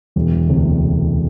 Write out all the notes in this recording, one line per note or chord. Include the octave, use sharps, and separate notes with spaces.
E1
D2 C3